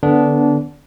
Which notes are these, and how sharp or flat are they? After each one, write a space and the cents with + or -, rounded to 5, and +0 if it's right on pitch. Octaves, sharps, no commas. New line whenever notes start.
D3 +0 B3 +0 D4 -20